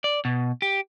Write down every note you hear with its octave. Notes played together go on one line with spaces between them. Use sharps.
D5
B2
G4